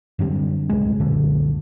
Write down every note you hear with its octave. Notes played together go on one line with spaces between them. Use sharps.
F#2 D3 G3 C4
D1 C2 C#3 G#3
C2 F#2 A#2 D3